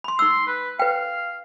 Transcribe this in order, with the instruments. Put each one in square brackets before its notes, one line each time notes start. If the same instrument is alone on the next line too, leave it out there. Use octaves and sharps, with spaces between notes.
[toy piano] B5 C6
[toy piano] D#4 E6 [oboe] C6
[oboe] B4
[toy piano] B4 G5 [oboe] F5